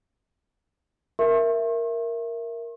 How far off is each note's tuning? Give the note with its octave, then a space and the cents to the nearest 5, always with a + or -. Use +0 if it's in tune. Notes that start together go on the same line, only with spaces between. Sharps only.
A#4 +0 E5 +10 C#6 -45